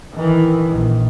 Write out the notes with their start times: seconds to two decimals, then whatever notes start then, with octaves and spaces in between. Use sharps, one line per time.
0.13 D#3 E3
0.68 A#1 D#3